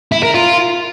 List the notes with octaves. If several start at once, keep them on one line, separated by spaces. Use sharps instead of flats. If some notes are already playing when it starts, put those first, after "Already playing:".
E4
A#4
F4